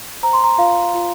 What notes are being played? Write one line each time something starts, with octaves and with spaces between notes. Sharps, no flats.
C5 A#5
C6
A#5
F4 F5
F4